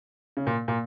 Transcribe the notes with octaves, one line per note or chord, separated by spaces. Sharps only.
C#3
A#2
A#2